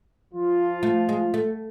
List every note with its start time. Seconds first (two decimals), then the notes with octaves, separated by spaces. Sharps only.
0.33 F3 F4
0.83 A3
1.09 G#3
1.34 A3